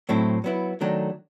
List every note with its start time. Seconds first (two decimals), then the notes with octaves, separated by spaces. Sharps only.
0.09 A2 F#3 A3 C4 E4
0.44 F#3 B3 E4
0.81 D#3 F#3 A3 D4